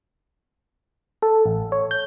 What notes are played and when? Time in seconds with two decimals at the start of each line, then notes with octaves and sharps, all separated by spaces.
1.22 A4
1.46 A1
1.72 C#5
1.91 G6